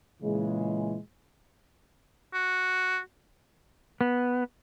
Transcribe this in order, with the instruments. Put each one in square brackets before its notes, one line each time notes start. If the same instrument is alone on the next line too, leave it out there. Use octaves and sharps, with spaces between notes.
[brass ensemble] A#2 C#3 E3 G#3
[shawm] F#4
[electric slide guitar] B3